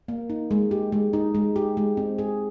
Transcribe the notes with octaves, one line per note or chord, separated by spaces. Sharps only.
A#3
D#4
G#3
G4
G#3
D#4
G#3
G4
G#3
C4
G#4